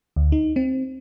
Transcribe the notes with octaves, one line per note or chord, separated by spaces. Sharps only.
D2
D#4
C4